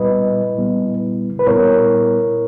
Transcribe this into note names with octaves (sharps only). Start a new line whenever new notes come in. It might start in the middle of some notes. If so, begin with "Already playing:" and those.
Already playing: A#2 G3 B3 E4 B4 D#5
A#2 G3 B3 E4
B4
A#2 G3 B3 E4 A#4 C#5